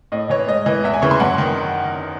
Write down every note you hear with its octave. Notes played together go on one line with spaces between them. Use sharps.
A2 D#5
E3 C#5
G#2 D#5
E3
E2 E5
G#5
C#3 E3 C#6
C6
F#2 F#5
D#3